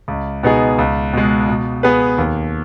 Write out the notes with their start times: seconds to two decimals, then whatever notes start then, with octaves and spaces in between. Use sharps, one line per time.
0.08 C#2
0.43 B2 B3 D#4 G#4
0.78 C#2
1.13 B2 G#3
1.49 B2
1.83 B3 G#4 B4
2.18 D#2